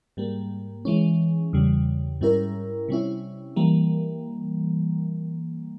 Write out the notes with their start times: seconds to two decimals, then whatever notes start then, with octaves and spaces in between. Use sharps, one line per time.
0.17 G#2 G3 A#3
0.85 E3 G#3 C#4
1.53 E2 C#3 G3
2.21 G#2 G3 C#4 E4 A#4
2.88 C3 G3 C#4 E4
3.56 E3 G3 A#3